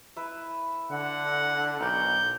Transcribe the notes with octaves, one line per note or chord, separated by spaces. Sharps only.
E4 B4 E5
D3 F#5
B1 A#4 D5 G6